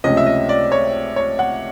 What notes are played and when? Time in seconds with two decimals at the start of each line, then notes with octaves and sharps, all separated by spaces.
0.04 C#2 C3 F3 A3 C#4 D#5
0.17 E5
0.26 D#5
0.49 D5
0.72 C#5
1.16 C#5
1.39 F#5